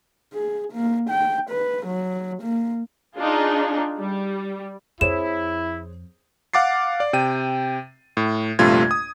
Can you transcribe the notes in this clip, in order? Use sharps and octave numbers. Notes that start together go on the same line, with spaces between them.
G#4
A#3
G5
B4
F#3
A#3
D4 D#4 F4 G#4
G3
F2 E4 G#4 C5 C#5 E7
F5 F#5 D6 A6 C7
D5
C3 G5 D#7
A2
A#1 G2 C3 A3 F4 G#6
D#6